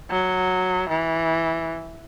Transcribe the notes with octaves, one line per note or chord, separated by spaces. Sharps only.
F#3
E3